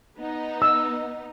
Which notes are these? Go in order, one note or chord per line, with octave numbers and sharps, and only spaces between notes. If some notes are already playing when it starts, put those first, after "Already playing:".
B3 D#4
E6